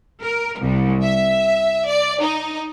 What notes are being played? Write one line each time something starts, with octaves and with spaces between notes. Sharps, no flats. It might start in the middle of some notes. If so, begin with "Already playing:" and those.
A#4
C2
E5
D5
D#4